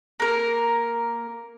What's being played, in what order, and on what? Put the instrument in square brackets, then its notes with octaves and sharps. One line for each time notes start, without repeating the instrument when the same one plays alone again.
[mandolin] A#3 A#4